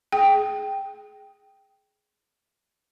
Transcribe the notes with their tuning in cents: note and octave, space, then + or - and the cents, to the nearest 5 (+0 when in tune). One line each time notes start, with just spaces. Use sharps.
G#4 +15 G5 +0